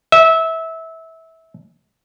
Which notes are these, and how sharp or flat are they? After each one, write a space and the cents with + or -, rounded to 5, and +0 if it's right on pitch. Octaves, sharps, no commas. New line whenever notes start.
E5 -20